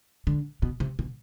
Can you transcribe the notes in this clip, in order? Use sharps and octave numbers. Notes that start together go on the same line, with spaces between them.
D3
B2
C3
B2